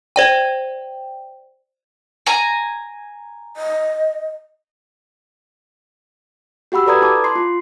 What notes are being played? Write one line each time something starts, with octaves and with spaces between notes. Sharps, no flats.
C5 D5 G5
G#5 A#5
D#5
F#4 G4 F#5 B5 E6
A4 B4 D5 A#5 D#6 G#6
E4 A5 D6
C6 C7
F4